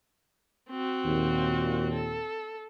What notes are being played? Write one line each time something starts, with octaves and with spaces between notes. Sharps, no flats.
C4 F#4
D#2 A#2
A4